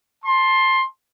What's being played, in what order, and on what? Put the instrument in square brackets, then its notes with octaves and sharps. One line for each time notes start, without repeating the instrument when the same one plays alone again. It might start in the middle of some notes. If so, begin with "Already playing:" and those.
[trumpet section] A5 C6